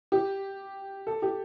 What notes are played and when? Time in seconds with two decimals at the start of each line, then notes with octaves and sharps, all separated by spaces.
0.12 G4
1.07 A4
1.22 G4